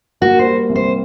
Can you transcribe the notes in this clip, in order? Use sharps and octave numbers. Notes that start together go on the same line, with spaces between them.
A#3 F#4
C5
G3
C2
C5